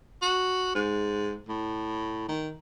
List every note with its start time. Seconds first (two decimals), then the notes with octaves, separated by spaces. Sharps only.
0.22 F#4
0.75 G#2
1.48 A2
2.29 D#3